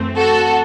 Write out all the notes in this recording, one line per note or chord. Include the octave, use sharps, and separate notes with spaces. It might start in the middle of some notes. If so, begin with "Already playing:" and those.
Already playing: F#2 E3 A3 C4
F#4 A4